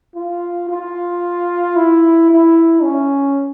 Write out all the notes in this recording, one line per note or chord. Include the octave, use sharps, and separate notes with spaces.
F4
F4
E4
E4
C#4